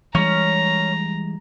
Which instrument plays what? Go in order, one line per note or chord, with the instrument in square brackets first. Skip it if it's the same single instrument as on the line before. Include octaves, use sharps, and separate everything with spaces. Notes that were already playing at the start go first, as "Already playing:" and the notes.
[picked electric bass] E3 G3 G#3 [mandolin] C#4 [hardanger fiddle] A#5